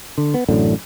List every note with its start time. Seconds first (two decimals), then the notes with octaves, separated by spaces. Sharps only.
0.18 D3
0.34 B3
0.49 A1 F#2 A2 D3